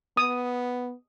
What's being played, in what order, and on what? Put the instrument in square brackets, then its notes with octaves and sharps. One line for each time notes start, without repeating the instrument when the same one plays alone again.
[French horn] B3 [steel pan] D#6